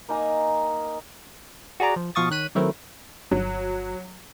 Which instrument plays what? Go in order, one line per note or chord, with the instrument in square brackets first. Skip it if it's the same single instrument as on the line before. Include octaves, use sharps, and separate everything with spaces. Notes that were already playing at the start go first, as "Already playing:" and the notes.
[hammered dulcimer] A#3 D#4 G#5 A#5
[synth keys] F#4 G#4 D5 A#5 D6
F3
B2 F3 F5 C#6 D#6 A6
D#3 C#5 F#6 B6 D#7
D#3 F#3 A3 C4 E4 A#4
[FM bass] G1 [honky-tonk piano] F#3